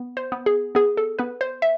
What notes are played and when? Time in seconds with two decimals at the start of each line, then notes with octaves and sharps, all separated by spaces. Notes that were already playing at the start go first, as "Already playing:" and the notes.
Already playing: B3
0.17 C5
0.32 B3
0.46 G#4
0.75 B3 G#4
0.97 A4
1.19 B3 B4
1.41 C5
1.62 E5